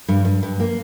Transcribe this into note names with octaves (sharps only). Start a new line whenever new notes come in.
G2
G2
G2
A#3